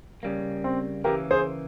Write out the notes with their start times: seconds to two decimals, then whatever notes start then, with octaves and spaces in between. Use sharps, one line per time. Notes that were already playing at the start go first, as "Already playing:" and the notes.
0.23 C#3 G3 A#3
0.64 C4
1.04 C#3 E3 A#3 G4 A#4
1.31 G#4 C5